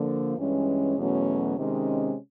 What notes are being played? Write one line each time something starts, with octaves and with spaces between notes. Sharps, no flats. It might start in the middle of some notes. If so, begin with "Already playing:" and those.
Already playing: D3 F3 A#3
G2 E3 G#3 C#4
E2 B2 F#3 A3 C#4
C3 D#3 G#3 C#4